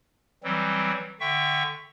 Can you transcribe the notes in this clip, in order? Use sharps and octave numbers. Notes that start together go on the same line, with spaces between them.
E3 F#3 G3 C4
D3 E5 G5 C#6